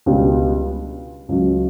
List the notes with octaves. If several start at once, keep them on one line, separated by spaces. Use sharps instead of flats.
C#2 B2 G3 D4
C#2 C#3 F#3